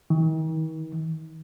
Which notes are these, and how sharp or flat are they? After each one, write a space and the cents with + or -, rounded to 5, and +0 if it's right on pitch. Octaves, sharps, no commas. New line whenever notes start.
D#3 +45